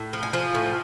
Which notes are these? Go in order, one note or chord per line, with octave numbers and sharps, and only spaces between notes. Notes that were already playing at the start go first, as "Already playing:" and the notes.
Already playing: A2
F3
G#5
F3
A2